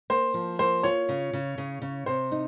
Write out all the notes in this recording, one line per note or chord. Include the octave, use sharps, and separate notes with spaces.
A#3 C5
F3
A#3 C5
F4 C#5
C#3
C#3
C#3
C#3
C3 C5
D#4